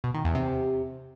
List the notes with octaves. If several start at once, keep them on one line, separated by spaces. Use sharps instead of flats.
B2
D#3
E2
C3